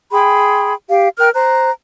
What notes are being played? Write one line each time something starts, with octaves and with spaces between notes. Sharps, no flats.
G#4 G5 B5 C6
G4 F5
A#4 G5 F6 F#6
C5 A#5 F#6